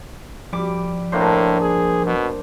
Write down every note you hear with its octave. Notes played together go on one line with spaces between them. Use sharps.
F3 G3 D6
A2 A#3 D4 C5
G#4
B2